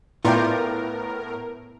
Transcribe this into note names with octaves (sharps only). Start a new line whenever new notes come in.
A2 A3 B3 E4 F4 A#4 D5 G5